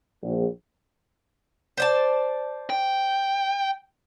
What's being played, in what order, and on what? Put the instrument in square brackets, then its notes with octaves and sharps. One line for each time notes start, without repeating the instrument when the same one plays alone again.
[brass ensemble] A#1
[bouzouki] C5 D5 A5
[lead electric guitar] G5